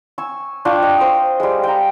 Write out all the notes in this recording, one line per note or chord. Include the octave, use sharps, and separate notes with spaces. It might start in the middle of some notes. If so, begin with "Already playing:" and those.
G#5 C#6 E6
D4 F4 G5 C#6
D#5
C5 D#6
G3 G#3
G5 A#5